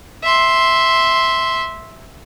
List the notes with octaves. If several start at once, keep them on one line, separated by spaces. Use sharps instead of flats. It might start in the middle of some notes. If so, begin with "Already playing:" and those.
E5 C6